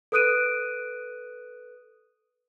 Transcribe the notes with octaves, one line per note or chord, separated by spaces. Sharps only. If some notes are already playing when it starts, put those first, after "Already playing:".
A4 B4 D#6 F#6 D7 D#7